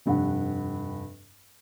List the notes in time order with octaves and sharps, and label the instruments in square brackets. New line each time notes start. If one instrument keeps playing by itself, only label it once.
[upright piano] F1 G2 F#5